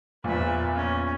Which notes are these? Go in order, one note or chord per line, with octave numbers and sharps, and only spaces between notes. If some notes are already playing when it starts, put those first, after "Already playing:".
A#1 E2 A#2 B4 E5
C#4